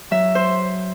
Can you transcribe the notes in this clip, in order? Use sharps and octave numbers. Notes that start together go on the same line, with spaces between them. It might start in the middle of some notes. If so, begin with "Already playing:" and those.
F#3 E5
C5